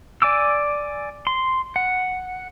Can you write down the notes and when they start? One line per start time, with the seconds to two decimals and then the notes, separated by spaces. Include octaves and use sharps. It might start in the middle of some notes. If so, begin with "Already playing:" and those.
0.22 D5 G#5 D6 E6
1.27 C6
1.76 F#5